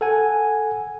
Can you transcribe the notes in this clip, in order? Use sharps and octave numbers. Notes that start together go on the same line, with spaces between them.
A4 F#5 G#5